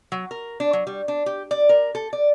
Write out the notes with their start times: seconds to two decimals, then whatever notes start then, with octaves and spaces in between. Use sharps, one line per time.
0.12 F#3
0.31 A#4
0.60 D4
0.73 F#3
0.87 G3
1.08 D4
1.26 G4
1.51 D5
1.69 A#4
1.95 A4
2.13 D5